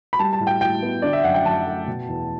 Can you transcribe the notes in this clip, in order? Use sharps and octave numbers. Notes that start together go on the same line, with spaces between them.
B5
G3 A5
A5
A2
G5
A2 G5
B3
D3 D5
E5
F#2 F#5
G5
F#2 A5
A3
B2
E2